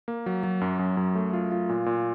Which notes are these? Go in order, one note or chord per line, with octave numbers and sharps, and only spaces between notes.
A#3
F#3
F#3
F#2
F#2
F#2
A3
F4
F4
A#2
A#2